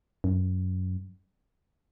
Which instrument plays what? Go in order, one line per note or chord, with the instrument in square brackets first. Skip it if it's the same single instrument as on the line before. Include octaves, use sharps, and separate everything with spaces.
[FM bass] F#2